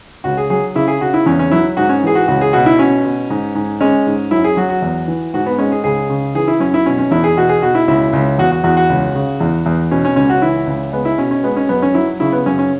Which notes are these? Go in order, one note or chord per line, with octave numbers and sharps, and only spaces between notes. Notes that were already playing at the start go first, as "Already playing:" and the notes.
C#2 F#4
G#4
F#3 G#4
C#3 E4
G#4
C#3 F#4
E4
E2 C#4
C#4
F#3 E4
G#2 F#4
C#4
E3 G#4
F#4
C#2 F#4
G#4
B2 F#4
E4
B2 C#4
B2
G#2
G#2
G#3 C#4
G#2
F#2 E4
G#4
F#3 F#4
F#4
E2
E3
G#2 F#4
B3
G#3 C#4
G#4
C#2 G#4
C#3
E3 G#4
E4
F#2 C#4
E4
B2 C#4
C#4
E2 E4
G#4
B2 F#4
G#4
B2 F#4
E4
C#2 E4
C#2
E2 F#4
F#4
E2 F#4
F#4
C#2
C#3
E2
E2
B2 C#4
C#4
C#2 C#4
F#4
E3 E4
C#2
G#3 B3
E4
B2 C#4
C#4
G#3 B3
C#4
F#2 B3
C#4
F#3 E4
C#3 E4
B3
F#2 C#4
C#4